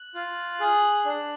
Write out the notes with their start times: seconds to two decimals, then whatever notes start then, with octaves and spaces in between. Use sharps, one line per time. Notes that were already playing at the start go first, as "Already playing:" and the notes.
Already playing: F#6
0.15 F4
0.60 G#4
1.05 D4